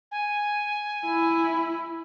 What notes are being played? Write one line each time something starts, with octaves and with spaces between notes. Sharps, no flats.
G#5
E4